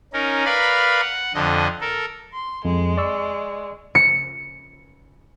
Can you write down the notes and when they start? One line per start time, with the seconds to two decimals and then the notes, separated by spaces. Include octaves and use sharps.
0.13 C#4 D#4 A#4
0.45 A#4 B4 D5 F5 B5
1.01 F#5
1.34 F2 D3 D#5
1.81 A4 A#4
2.34 C6
2.65 F2 G#3
2.97 D5 C#6 E6
3.95 C#7